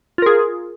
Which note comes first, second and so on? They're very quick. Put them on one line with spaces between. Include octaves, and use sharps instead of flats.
F4 A#4 G#4